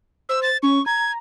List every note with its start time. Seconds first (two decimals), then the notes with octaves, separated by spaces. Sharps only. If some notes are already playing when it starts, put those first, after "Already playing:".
0.29 C5 E6
0.43 A6
0.63 C#4 C#6
0.86 A#5 G#6